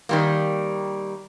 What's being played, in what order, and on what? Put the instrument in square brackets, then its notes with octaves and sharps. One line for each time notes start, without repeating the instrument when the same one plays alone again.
[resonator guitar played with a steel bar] D#3 G3 A#3